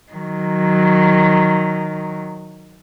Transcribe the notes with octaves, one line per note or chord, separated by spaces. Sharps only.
D#3 F#3